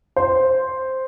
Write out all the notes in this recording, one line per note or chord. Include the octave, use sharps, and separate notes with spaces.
C5